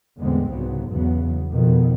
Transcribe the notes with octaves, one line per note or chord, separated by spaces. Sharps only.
E2 A2 D3 G#3 B3 C4
C2 G#2 C#3 F#3 B3
E2 C#3 F#3 B3
F2 B2 D#3 F3 B3